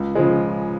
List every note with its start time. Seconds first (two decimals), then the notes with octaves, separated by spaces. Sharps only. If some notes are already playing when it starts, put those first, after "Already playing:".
Already playing: C#2
0.15 C#3 F3 G#3